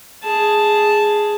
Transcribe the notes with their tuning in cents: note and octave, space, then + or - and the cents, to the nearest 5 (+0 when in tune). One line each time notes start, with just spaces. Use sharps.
G#4 +0 A5 -5